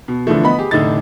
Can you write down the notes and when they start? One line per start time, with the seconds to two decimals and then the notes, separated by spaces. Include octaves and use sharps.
0.08 B2
0.27 D3 E3 F3 A3
0.43 B3 D#5 B5
0.59 G4 G#4
0.71 F1 A2 D3 D4 D#4 A6